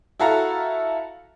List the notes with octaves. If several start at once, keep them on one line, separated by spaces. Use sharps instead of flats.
E4 F#4 A4 F5 A#5